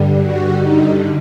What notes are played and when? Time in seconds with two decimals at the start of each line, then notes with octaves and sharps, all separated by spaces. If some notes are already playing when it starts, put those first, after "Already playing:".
Already playing: G2 D3 G3
0.22 F#4
0.57 D#4